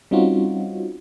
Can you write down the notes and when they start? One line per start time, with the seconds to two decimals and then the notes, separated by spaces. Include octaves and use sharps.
0.11 G3 C4 C#4 D#4 F4 F#4